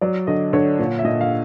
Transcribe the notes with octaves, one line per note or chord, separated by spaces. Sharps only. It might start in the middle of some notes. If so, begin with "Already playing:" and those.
F#3 D5
D3 D#5
D3 C#5
A#2 C#5
E5
A#2 D#5
F5